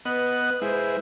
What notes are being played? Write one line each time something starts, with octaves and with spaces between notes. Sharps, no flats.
B3 B4 D#5 F#5 F#6
G#3 E4 C5